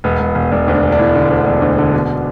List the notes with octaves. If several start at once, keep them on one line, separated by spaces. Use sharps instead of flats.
E1 B3
E1
E1
E1 D4
D2
D4
E1
D4
E1 E4
D3
D2
E1 D4
D2
D3
B2